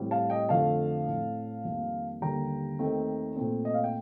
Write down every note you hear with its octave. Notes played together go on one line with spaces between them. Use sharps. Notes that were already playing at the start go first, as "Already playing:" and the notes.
Already playing: A2 G3 C4
F5 A5
D#5 G5
F2 D3 F3 A3 F5 A5
A2 A3 C4
F2 D#3 G3 A#3
D#2 D3 G3 A#3 G5 A#5
D#2 D#3 A3 C4
A#2 A3 C4
D#5
F5
G5